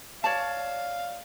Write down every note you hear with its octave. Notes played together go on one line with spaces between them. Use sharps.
C#5 D5 F5 A5